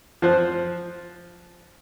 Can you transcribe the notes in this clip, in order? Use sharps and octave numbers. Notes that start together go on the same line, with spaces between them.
F3 C5 F#6